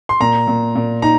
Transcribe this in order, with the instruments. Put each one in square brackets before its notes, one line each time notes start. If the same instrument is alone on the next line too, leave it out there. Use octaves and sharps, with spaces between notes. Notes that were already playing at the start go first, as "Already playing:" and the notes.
[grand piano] C6
[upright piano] A#2 [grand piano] A#5
[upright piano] A#2
A#2
[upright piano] D#4 [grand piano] A#5